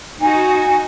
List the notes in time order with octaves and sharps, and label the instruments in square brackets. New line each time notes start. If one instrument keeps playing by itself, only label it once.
[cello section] D#4 F#4 [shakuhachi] G#5